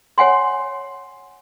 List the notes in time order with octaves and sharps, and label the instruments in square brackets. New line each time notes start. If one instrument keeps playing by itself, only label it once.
[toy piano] C#5 F#5 G#5 C6